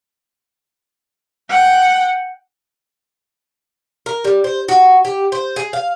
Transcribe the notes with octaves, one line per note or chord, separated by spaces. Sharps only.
F#5 G5
A#4
G3
C5
F#4
G4
C5
G#4
F5